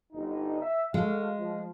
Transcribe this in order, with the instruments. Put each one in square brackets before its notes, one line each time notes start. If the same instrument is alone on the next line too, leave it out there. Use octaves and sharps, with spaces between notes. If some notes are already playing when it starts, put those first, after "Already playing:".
[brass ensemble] G1 D#4
E5
[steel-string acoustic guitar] G#3 [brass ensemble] F#4 A4 F5
[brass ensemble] F3